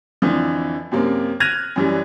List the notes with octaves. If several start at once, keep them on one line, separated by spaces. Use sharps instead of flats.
F2 D3 E3 F3
F#2 C3 A#3 C4
F6 F#6 G#6 A#6 D#7 F7
F#2 E3 G3